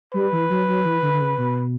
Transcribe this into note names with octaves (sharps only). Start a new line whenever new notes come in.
G3 B4
E3
F#3
F#3
E3
D3
D3
C#3
B2